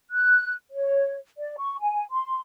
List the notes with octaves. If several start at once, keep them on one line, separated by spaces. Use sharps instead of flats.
F#6
C#5
D5
C#6
G#5
C6